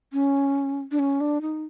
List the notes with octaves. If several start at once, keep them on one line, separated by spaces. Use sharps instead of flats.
C#4
D4
C#4
D4
D#4